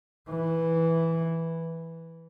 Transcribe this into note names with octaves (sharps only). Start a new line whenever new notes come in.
E3